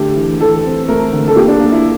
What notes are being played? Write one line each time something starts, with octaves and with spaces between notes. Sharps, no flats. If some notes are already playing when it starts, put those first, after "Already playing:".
Already playing: D3 A3 G4
E3
E3 A4
C4
A3 A#4
D3
A4
A#3 G4
D4
A#3
E4